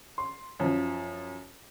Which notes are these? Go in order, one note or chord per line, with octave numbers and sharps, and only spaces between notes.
C6
F#2 F3